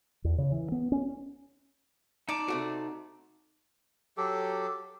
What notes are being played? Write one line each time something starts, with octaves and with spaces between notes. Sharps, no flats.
E2
C#3
E3
B3
C#4
D#4 D5 A5 D6
C3 A3 F#4
F#3 G4 A4